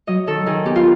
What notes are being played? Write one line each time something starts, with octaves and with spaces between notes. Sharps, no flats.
F#3 D#5
D#3 A4
D#3 G#4
B3 G4
F4